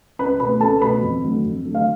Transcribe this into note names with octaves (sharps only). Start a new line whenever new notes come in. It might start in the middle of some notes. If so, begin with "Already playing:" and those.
C#2 B4 B5
B2 A3 B4 B5
C#2 A4 A5
B2 A3 B4 B5
F2
D3 F#3 A3
F2
D3 F#3 A3
F5